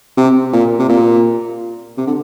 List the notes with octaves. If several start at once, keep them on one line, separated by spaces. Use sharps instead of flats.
C3
A#2
C3
A#2
C3
D3